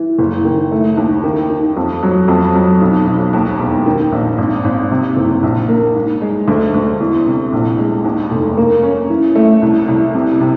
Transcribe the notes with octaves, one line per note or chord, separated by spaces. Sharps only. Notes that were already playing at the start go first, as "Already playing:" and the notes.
Already playing: E3
F#1
D#3
A3
D#2
D#3
D#3
F2
F#3
F2
F#3
B1
B1
D#2
E1
D#3
A#1
G#1
G#1
C3
F#1
A#1
A#3
G#2
G#3
D2
D2
E2
C3
A#1
G#3
D#2
F1
A#3
C#4
E3
A3
C2
C2
C3
C3